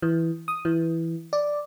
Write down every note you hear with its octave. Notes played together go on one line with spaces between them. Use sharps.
E3
D#6
E3
D5